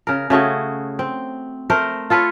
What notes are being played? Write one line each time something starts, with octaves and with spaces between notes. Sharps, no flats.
C#3 A#4
C#3 A3 F#4 G#4
C4
A3 A#4 C5
F4 A4 B4 C#5